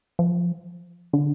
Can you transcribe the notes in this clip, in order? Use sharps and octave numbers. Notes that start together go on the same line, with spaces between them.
F3
D3